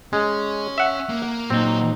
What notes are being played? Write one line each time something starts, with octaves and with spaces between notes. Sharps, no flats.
G#3 C#4
E5 F#5
A#3
A#2 F#3 C4 D#4